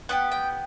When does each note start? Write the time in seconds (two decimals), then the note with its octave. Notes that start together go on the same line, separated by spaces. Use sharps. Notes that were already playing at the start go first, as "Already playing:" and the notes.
0.09 B3 D4 G4 F#5
0.32 G5